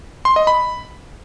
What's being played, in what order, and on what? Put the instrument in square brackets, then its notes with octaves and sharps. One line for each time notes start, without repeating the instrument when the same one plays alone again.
[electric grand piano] C6
D#5
B5